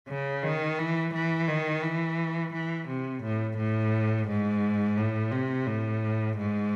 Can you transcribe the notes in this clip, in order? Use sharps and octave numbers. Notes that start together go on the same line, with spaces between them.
C#3
D#3
E3
E3
D#3
E3
E3
C3
A2
A2
G#2
A2
C3
A2
G#2